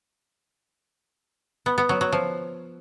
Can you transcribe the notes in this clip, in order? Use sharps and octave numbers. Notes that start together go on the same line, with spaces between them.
B3
B3
F#3
F#3
F3